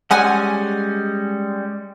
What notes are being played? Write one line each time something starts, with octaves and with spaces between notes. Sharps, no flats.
G3 G#3 C#4 F#5 G#5